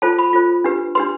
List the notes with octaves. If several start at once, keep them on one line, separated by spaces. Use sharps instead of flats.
F4 A4 C5 A5
B5
F4 A4 C5
D4 G4 B4
D4 G4 B4 C6